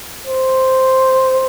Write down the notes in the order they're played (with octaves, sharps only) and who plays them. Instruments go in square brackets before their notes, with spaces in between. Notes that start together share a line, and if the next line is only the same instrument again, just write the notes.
[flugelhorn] C5